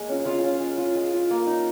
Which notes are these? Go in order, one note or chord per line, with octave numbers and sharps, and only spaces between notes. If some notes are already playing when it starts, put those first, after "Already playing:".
Already playing: G#3 A#3
C#4 F4
G#3 F4 F5
C#4 F4
G#3
F4
G#3
F4
A#3
D#4